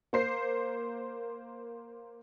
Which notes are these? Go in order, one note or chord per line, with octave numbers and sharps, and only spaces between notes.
A#3 C5 C7